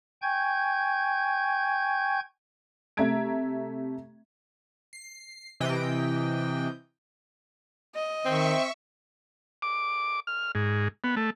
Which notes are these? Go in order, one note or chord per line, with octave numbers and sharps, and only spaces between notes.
G5 G#5 C#6 G6 G#6
C3 A3 E5 A#5 G#6 D7
C7
C3 E3 D#5 G5
D#5
D#3 C4 E5 C#6
D6
F6
G#2
B3
A3